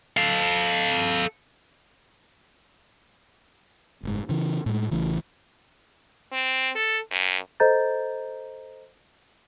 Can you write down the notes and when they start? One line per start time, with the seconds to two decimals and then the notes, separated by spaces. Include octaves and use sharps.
0.17 A4 F5
4.03 F#1 G#2
4.29 C#3 E3
4.66 A2 G#3
4.91 A1 A2 C#3 E3
6.32 C4
6.75 A4
7.11 F#2
7.60 A4 C5 D#5 A#5 G6 A6